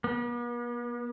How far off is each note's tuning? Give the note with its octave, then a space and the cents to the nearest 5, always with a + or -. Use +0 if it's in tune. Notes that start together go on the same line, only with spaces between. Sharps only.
B3 -45